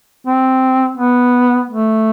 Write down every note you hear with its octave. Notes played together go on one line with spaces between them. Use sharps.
C4
B3
A3